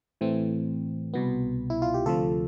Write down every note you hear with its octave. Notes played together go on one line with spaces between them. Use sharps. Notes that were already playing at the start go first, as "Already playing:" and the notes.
A2 E3 A3 C4
C2 B2 B3
E4
F4
G4
D2 C3 F3 F4 A4